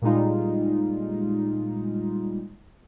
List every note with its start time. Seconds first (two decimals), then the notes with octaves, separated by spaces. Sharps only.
0.02 A#2 G3 G#3 D#4 F4